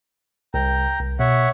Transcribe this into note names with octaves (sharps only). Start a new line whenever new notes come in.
C2 G5 A#5
C2
B2 C#5 E5 F#5